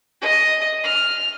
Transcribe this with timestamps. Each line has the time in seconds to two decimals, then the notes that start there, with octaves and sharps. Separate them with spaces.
0.22 D#5
0.84 F6